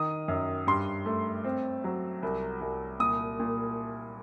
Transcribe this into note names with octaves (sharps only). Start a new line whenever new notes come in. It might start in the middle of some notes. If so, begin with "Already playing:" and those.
Already playing: D#3 D#6
F#2
G2 C6
A3
C4
F#3
C2
C2
A#2 D#6
A#2